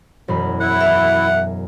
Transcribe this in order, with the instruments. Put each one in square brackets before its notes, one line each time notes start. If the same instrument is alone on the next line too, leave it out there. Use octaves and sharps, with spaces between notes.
[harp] E1 F#2 B5
[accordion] E4 [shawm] F#5
[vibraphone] E5